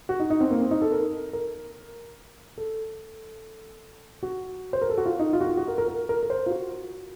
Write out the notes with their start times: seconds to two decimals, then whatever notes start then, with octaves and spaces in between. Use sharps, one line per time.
0.09 F#4
0.20 D#4
0.30 D#4
0.40 C4
0.51 A#3
0.61 C4
0.71 D#4
0.82 A4
0.92 A#4
1.33 A#4
2.58 A4
4.23 F#4
4.73 C5
4.81 A#4
4.90 A4
4.98 F#4
5.06 F4
5.19 D#4
5.33 F4
5.41 F#4
5.47 F4
5.57 F#4
5.68 A#4
5.78 A#4
5.88 A#4
6.09 A#4
6.23 A#4
6.30 C5
6.46 F4
6.51 F#4